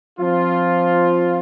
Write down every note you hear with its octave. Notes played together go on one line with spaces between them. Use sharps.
F3 C4 F4